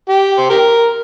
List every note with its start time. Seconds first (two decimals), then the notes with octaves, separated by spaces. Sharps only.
0.09 G4
0.38 C5
0.50 G4 A#4